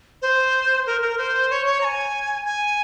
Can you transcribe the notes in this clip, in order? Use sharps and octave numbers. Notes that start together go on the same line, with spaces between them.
C5
A#4
A#4
C5
C#5
C#5
A#5
G#5
G#5